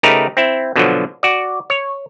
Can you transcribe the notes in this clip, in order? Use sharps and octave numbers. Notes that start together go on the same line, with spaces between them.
C#3 A3 D#4 G4 A#4 B4
C4 E4
B2 D3 F3 F#3
F#4 D5
C#5